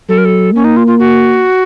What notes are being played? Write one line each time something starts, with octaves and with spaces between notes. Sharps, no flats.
F#3 A4
A#4
A4
A#3 C#4
D#4
F4
F4
F#4